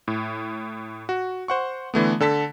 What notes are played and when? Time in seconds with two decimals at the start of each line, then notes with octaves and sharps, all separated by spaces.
0.08 A2
1.09 F#4
1.48 C5 F#5 C#6
1.94 D3 E3 A3 B3
2.20 D3 A4 A5 B6